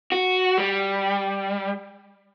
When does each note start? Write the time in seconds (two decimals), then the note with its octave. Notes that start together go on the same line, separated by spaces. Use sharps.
0.12 F#4
0.58 G3